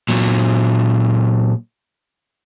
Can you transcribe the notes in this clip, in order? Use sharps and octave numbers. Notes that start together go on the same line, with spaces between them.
A#2 F#3